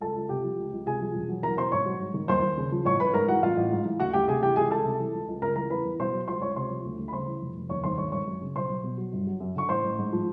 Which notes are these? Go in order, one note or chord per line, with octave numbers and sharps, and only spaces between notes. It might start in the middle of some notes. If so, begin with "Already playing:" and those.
C#2 A4 A5
C#2
C3 G4 G5
F3
C#2
C#2
C3 G#4 G#5
F3
E1
F#3
E2 A#4 A#5
B2 C5 C6
G#1 C#5 C#6
F#3
G#2
D#3
D#2 C5 C6
D#2
C#3
F3
A1 C#5 C#6
A1 B4 B5
G#2 A#4 A#5
E3 F#4 F#5
A1 F4 F5
A1
G#2
E3
D2 F#4 F#5
D2 G4 G5
C3 G#4 G#5
E3 G4 G5
C#2 G#4 G#5
C#2 A4 A5
C3
E3
C#2
C#2
C#3 A#4 A#5
E3 A#4 A#5
E2 B4 B5
E2
B2 C5 C6
F#3
C#2 C5 C6
C#2 C#5 C#6
C3 C5 C6
F3
D2
D2
B5
C#3 C5 C6
E3
F1
F1
D#2 C#5 C#6
D#3 C5 C6
G#1 C#5 C#6
G#1 C#5 C#6
F#2
C#3
B1 C5 C6
B1
B2
F#3
G1
F#3
F#2
D3 C#6
A1 C5 C6
A1
G#2
F3